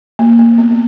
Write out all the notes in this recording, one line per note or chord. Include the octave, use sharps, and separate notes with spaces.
A#3
A#3
B3
B3